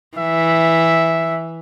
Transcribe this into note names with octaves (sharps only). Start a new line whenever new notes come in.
E3 E5